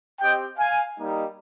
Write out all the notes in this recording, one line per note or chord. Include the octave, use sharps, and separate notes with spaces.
C4 G4 D#5 G5
F5 G#5
G3 A#3 D#4